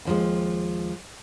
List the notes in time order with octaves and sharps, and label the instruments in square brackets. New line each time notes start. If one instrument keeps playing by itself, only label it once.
[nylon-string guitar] D#2 F3 G#3